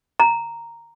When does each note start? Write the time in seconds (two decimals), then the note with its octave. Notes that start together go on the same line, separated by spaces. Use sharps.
0.20 A#5